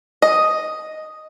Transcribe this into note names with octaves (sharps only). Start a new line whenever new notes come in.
D#5